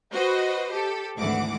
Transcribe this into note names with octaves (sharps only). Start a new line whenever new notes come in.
F#4 B4 C5 D#5
G4 A4
G#1 D2 G#2 E3 F#5 D6